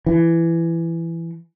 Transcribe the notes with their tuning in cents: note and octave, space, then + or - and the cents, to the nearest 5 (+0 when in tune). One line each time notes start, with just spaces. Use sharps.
E3 +15